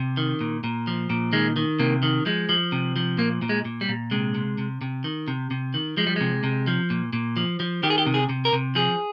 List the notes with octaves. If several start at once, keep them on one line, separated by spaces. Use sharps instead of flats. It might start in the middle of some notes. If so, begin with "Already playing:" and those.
Already playing: C3
D#3
A#2
A#2
F3
A#2
D#3 G#3
D#3
C3 A#3
D#3
F3 G#3
F3
C3
F3
A#2 A#3
A#2
G#3
A#2
G3
A#2
C3 G#3
C3
C3
C3
D#3
C3
C3
D#3
F3 G#3
G3
C3 G#3
C3
F3
A#2
A#2
F3
F3
D#3 G4
G#4
G4
C3
G#4
C3
A#4
C3
F3 G#4